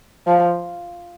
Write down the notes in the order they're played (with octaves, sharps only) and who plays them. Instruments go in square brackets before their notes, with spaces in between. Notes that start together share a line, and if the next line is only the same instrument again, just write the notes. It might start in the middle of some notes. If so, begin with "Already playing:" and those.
[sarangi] F3